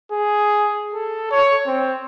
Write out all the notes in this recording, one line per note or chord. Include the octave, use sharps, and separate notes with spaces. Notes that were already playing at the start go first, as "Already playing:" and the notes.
G#4
A4
C#5
C4